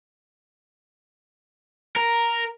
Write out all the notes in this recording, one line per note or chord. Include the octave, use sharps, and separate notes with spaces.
A#4